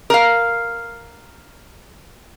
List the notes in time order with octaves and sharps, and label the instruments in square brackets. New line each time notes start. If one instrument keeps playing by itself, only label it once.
[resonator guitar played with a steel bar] A#4 F5